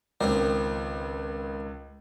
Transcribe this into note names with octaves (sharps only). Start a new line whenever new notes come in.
C#2 D#3 C4 A#4